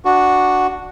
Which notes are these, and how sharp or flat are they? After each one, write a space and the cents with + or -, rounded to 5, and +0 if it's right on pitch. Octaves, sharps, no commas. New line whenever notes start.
D4 +0 F#4 +0